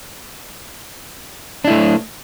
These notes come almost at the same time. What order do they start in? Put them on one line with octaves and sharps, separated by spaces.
D4 E4 A3